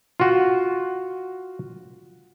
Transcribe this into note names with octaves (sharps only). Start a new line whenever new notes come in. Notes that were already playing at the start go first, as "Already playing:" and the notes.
F4 F#4